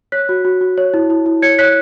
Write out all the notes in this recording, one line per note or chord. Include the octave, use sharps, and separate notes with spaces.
C#5 F#6 B6
F#4
F#4
F#4
C#5
E4
E4
E4
C#5 G#6 C#7
C#5 F#6 B6